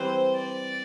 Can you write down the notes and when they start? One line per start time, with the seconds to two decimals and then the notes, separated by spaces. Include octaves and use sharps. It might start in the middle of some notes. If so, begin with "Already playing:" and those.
Already playing: E3 G3 C4 E4 C5
0.36 D5